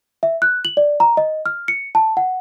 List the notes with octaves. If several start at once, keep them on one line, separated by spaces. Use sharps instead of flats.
E5
F#6
F#7
D5
A#5
D#5
F6
C#7
A5
F#5